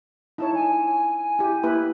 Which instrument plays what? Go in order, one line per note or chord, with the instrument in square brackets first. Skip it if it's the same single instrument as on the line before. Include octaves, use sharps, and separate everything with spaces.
[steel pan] D#4 E4 C#5 [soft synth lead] A5
[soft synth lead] G#5
[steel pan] E4 G4
A#3 E4 B4